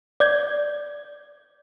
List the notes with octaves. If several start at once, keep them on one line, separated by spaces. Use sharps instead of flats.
D5 G6 G#6